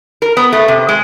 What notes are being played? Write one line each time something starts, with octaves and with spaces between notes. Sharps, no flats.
A#4
B3
A3
C3
G#3